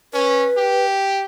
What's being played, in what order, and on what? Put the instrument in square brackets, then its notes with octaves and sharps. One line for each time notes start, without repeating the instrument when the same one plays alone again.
[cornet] C#4 [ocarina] B4
[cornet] G4